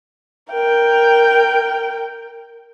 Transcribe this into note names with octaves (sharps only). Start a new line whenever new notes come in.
A#4 G5